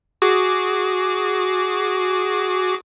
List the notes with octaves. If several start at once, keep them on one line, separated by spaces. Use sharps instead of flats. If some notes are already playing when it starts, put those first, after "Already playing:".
F#4 G#4 D6